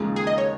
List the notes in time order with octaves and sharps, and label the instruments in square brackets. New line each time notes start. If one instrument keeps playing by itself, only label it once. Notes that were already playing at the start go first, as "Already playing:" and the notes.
Already playing: [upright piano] D#2 C#3 F3 G#3 D#4
[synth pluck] G#4
D#5
C#5